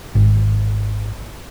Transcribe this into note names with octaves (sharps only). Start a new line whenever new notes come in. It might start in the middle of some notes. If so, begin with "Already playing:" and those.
G#1